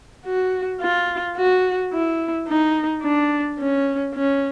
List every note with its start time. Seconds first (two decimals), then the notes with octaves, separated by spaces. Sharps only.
0.25 F#4
0.80 F4
1.36 F#4
1.92 E4
2.48 D#4
3.03 D4
3.59 C#4
4.14 C#4